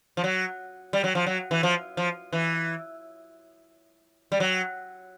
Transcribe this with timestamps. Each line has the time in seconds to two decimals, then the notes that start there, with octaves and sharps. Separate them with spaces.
0.17 F3
0.24 F#3
0.93 G3
1.04 F#3
1.15 F3
1.26 F#3
1.51 E3
1.63 F3
1.97 F3
2.33 E3
4.32 G3
4.40 F#3